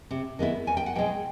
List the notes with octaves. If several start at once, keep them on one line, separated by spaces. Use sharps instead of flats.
C3
D#3 G#3 B3 E4
E2 G#5
G5
F#5
B2 G#3 G5